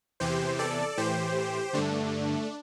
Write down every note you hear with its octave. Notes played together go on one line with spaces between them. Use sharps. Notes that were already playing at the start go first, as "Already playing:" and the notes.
E2 C3 E3 G4 C5
A4 D5
A2 E3 G4 C5
G2 D3 A3 D4